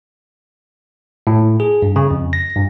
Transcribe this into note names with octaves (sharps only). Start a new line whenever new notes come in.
A2
G#4
G2
C#3
F2
A#6
G2